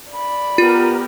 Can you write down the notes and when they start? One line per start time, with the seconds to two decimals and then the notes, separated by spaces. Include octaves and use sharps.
0.12 D5 B5
0.58 B3 F4 G4 A#4